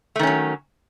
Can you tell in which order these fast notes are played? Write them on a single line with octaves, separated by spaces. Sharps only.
A3 D#3 C#4 F#3